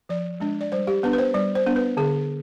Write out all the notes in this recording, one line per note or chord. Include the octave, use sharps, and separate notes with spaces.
F3 D5
G#3 D4
D5
G3 C5
G4
B3 D4 B4
B4
C5
G3 D5
C5
B3 D4
B4
D3 G#4